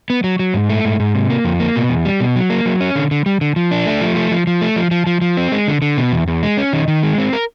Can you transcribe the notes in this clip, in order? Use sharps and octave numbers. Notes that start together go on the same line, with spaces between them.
B3
F#3
F#3
G#2
A3
G#2
G#2
C3
A#3
F2
A#3
B2
E2
G3
B2
F#3
A#3
F#3
C#4
D3
D3
G3
D3
F3
D4
A3
F3
A3
F3
F3
A3
F3
F3
F3
F3
C4
G#3
D3
D3
B2
E2
E2
G#3
C#4
D#3
D#3
G#3
C4
A#4